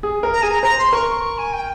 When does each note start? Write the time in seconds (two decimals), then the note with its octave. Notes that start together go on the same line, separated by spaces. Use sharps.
0.03 G#4
0.23 A#4
0.33 A#5
0.42 G#4 G#5
0.51 A#5
0.62 C5 A#5
0.77 C6
0.92 A#4 C#6
1.08 C#6
1.23 C#6
1.37 G#5
1.52 G5